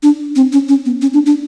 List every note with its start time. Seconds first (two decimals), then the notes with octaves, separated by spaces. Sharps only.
0.03 D4
0.36 C4
0.52 C#4
0.69 C#4
0.85 B3
1.02 C#4
1.13 D4
1.26 D4